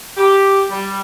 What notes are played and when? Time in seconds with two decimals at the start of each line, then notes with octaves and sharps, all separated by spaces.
0.17 G4
0.71 G3